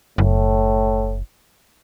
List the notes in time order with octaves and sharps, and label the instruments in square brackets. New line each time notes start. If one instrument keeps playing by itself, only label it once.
[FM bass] F#1 [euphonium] A2